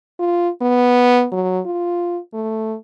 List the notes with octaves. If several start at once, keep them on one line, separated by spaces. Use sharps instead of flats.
F4
B3
F#3
F4
A3